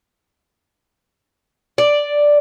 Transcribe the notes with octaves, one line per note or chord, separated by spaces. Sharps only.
D5